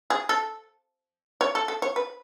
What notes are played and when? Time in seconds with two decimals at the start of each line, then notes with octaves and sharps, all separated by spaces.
0.10 G#4
0.29 A4
1.41 C#5
1.55 A4
1.68 A4
1.82 C#5
1.96 B4